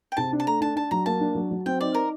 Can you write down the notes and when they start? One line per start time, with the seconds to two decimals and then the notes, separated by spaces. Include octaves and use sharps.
0.12 G5
0.17 C3 A5
0.32 D4
0.40 A5
0.46 A3 A#5
0.61 D4 A5
0.76 D4 A5
0.91 F#3 A#5
1.06 A#3 A5
1.20 D4
1.35 F#3
1.51 F#3
1.66 C4 G5
1.81 D#4 D5
1.94 A#4